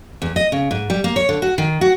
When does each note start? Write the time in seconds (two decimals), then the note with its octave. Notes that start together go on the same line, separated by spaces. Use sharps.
0.22 E2
0.36 D#5
0.52 C#3
0.71 G#2
0.90 G3
1.04 A#3
1.16 C#5
1.29 D3
1.42 F#4
1.58 D#3
1.81 F#4